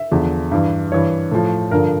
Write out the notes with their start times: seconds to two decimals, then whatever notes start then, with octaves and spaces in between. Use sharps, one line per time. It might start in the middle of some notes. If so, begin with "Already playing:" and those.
Already playing: E5
0.12 E2 D3 F3
0.51 G2 E3
0.92 G2 E3 C#5
1.32 A2 F3
1.71 G2 D3 F3 A#4